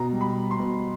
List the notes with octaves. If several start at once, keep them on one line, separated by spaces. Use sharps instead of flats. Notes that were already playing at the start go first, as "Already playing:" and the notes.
Already playing: B2 A#5
G3
B5
G3
C6
B2